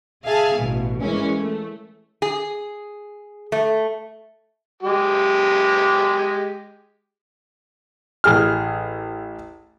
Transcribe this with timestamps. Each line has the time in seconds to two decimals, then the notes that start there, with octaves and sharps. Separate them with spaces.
0.24 G#4 E5 F5 G#5 A5
0.55 A1 B2
1.00 E3 G#3 A#3 C#4
1.38 A3
2.22 G#4
3.52 A3
4.83 G#3 G4
8.24 A1 G#4 F6